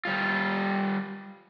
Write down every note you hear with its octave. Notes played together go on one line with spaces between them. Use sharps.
G3 F4